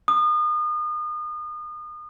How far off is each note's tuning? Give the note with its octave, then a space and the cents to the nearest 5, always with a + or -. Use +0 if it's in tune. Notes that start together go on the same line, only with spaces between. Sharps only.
D#6 -35